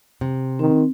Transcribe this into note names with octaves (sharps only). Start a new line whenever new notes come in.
C3
D#3 C4